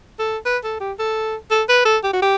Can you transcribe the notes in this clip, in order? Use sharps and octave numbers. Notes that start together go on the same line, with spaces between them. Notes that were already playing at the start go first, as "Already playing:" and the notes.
A4
B4
A4
G4
A4
A4
B4
A4
G4
F#4
G4